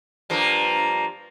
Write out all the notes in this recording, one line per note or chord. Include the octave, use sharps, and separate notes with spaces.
G2 F3 A#3